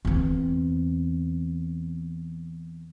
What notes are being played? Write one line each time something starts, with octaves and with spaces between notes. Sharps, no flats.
E2 C4